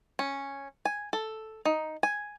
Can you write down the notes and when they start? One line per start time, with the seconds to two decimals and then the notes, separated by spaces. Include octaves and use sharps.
0.19 C#4
0.85 G#5
1.13 A4
1.65 D#4
2.03 G#5